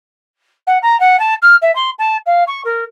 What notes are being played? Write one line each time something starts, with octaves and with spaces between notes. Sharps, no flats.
F#5
A#5
F#5
A5
F6
E5
C6
A5
F5
C#6
A#4